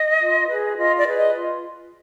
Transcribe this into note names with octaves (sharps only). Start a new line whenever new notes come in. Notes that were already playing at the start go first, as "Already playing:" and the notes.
Already playing: D#5
F4
G#4 B4
F4 D#5
D5
G#4 B4
D#5
F4